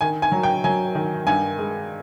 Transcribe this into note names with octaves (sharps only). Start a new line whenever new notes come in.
D#3 G#5
G#5
F#3
G5
F#3 G#5
D#3
G2 G#5
G#3